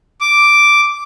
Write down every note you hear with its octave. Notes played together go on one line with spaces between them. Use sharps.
D6